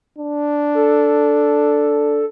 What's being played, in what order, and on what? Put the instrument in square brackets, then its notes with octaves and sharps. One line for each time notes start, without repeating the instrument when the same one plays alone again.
[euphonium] D4
[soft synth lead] A4